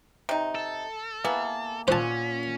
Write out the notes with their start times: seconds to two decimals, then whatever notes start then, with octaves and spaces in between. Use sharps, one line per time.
0.29 C3 D#4
0.55 A4
1.24 A#3 B3 E4 G#4
1.88 A#2 C#4 C5 F#5 A5